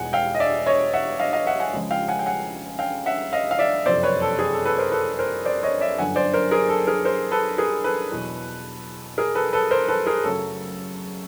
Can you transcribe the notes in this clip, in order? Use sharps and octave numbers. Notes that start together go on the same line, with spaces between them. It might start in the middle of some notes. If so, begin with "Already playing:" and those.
Already playing: E1 E2 B2 G#3 F#5 G#5
F5 G5
D#5
D5 E5
C#5 D#5
E5 F#5
D#5 F5
D#5 F5
E5 F#5
F#5 G#5
C#2 C#3 F3 G#3
F5 G5
F#5 G#5
G5
F#5 G#5
F5 G5
E5 F#5
D#5 F5
F5
D5 E5
F#1 F2 C3 C5 D5
B4 C#5
A4
G#4
A4
A4 B4
A#4 C5
A4 B4
A#4 C5
C5 D5
C#5 D#5
D5 E5
G1 F#2 D3 F#5 G#5
C5 D5
A#4 C5
G#4 A#4
A4
G#4 A#4
A#4 C5
A4 B4
G#4 A#4
A4 B4
E2 B2 F#3
G#4 A#4
A4 B4
A4 B4
A#4 C5
A4 B4
G#4 A#4
F#2 C#3 F#3 A3 A4